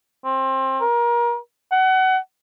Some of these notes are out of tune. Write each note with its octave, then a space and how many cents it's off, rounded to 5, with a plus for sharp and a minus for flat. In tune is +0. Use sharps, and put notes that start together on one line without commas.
C4 +25
A#4 +30
F#5 +25